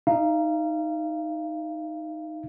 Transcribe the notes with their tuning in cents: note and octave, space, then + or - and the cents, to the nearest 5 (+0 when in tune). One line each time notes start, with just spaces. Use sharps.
D#4 +0 F5 -30